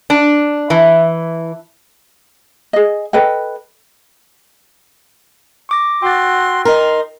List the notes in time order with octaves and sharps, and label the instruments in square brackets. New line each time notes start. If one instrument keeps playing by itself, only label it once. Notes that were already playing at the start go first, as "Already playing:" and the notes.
[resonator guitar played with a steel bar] D4
E3
[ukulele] G#4 D#5
A4 B4 D#5 G5
[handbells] C#6 D6 A#6
[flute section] F#4 C6 E6 [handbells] G5 A6
[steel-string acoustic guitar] D#4 A#4 [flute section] C6